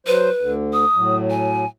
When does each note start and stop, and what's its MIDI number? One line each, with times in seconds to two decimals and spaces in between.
0.07 0.30 54
0.07 0.52 71
0.07 0.30 72
0.41 0.85 38
0.41 0.85 50
0.73 1.17 87
0.96 1.65 45
0.96 1.65 54
1.30 1.66 80